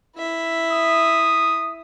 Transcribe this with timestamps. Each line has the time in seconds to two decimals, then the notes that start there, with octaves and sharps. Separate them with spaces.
0.17 E4 E5
0.72 D#6